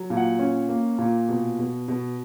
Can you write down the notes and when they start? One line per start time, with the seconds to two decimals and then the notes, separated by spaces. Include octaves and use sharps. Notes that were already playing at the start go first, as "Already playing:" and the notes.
Already playing: F#3
0.10 A#2
0.17 F#5
0.39 C#4
0.69 A#3
0.98 A#2
1.29 B2
1.59 B2
1.88 B2